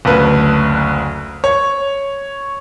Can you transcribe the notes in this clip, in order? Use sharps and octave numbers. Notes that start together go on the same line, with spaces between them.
F#1 D2 B4 A5
C#5